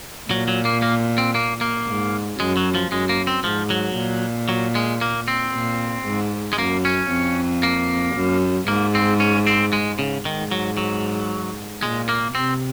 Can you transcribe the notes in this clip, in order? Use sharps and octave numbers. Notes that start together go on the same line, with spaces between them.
A#2 F#3
F#3
A#3
A#3
C4
A#3
A#3
G#2
F#2 G#3
F#3
F3
F#2 G#3
A#3
C4
G#2 F3
F#3
A#2
F#3
G#3
A#3
C4
A#2
G#2
G#3
F#2 A#3
C#4
F2
A#3
F#2
G#2 A#3
C4
C#4
C4
G#3
C#3
G#2 D#3
F#3
F#3
A#2 G#3
A#3
C3 C4